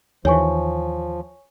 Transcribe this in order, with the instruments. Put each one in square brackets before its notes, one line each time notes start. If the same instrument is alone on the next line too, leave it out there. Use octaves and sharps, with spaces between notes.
[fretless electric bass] D#2 E3 [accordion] F3 [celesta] C#5 G#5 C#6